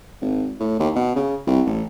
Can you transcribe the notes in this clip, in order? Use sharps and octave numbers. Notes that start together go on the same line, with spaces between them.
G#1
A2
D#2
B2
C#3
C2
A1